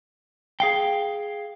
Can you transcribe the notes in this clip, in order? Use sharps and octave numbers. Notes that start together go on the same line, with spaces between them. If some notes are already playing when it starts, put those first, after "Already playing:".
G#4 F5 G5